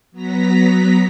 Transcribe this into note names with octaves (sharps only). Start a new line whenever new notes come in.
F#3 B3 A#5 A#6 B6